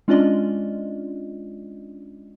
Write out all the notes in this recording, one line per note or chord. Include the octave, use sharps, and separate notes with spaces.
G#3 C#4 D4 F4 D5 D#5